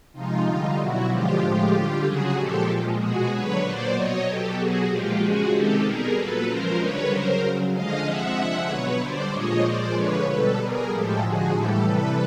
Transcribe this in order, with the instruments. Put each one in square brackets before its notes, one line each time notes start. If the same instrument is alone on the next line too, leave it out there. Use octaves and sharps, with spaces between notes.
[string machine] C3 F3 G#3 D#4 F4
D3 G3 D#4 F4
B2 F#3 E4 F#4
D3 F3 G#3 F4 G4
A2 F3 G#3
D3 G3
C#3 F#3 F#4 G#4
A#2 F3 G#3 G4 A4
A#2 F3 G#3
B2 G#3 F#4 G#4
D3 F#3 B4 C#5
A#2 F#3 C5 D5
B2 F#3 C#5 D#5
B2 F#3 G4 A4
B2 F#3 F#4 G#4
A#2 F3 G#3 F4 G4
C#3 F3 G#3 F#4 G#4
C3 D#3 G#3 G4 A4
B2 G3 G#4 A#4
A#2 F#3 A4 B4
C#3 F3 G#3 A#4 C5
D3 G3 B4 C#5
C#3 F#3 A#4 C5
C#3 F#3
D3 F3 G#3 D#5 F5
C3 F3 G#3 E5 F#5
D3 F3 G#3 E5 F#5
B2 F#3 B4 C#5
D3 G3 C5 D5
A#2 F3 G#3 C#5 D#5
A#2 F3 G#3 C5 D5
D3 F3 G#3 B4 C#5
B2 G3 A4 B4
B2 G3 G#4 A#4
A2 F3 G#3 G4 A4
D3 F3 G#3 F#4 G#4
A2 E3 G3 G4 A4
C3 E3 G3 A4 B4